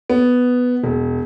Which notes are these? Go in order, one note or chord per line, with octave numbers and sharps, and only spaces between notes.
B3
E1